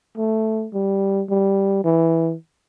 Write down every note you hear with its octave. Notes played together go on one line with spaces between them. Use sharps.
A3
G3
G3
E3